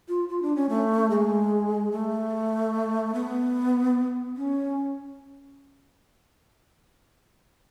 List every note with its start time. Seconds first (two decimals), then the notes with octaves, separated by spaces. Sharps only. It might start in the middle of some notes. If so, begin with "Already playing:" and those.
0.08 F4
0.29 F4
0.42 D4
0.56 C#4
0.69 A3
1.10 G#3
1.92 A3
3.14 B3
4.37 C#4